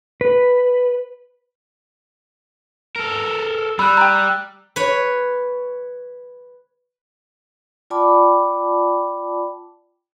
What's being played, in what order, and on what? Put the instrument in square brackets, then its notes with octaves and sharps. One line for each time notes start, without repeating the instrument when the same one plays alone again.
[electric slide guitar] B4
[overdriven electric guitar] A4 A#4
[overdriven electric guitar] G3 [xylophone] B5 [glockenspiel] E6 F#6
[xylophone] G5 A#5
[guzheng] B4 C#5
[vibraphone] F4 D5 G5 A5 B5 D6